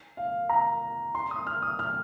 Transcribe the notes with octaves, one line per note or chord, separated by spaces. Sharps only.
F5
A#5
C6
D#6
F6
D#6
F6